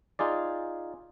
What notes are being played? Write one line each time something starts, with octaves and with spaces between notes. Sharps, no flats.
D#4 F4 G#4 D5